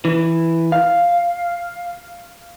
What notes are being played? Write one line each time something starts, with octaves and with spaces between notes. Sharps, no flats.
E3
F5